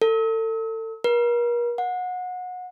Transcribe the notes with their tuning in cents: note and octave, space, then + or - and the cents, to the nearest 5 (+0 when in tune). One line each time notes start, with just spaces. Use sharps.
A4 +30
A#4 +40
F#5 -25